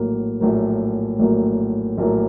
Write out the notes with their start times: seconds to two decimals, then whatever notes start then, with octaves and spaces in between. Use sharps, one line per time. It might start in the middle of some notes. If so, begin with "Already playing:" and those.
Already playing: A#1 A2 F#3 A#3
0.40 A#1 A2 F#3 A#3
1.19 A#1 A2 F#3 A#3
1.98 A#1 A2 F#3 A#3